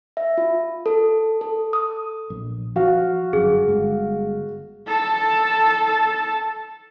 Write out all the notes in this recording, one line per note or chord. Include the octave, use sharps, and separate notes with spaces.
E5
F4
A4
A4
D#6
A#1
F3 F#4 F5
G1 F#2 G#4
G1 G#3
A4 A5